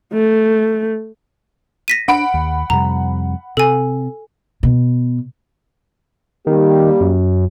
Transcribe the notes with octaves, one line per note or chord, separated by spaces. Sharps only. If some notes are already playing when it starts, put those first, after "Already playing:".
A3
A#6 B6 D#7
D4 F#5 B5 D7
D#2
F2 C3 G3 A#5
C3 A4 G#5
B2
D#3 G3 A#3 G4
F#2